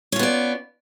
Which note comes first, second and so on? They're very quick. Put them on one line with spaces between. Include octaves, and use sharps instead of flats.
C#4 F4 B3 D5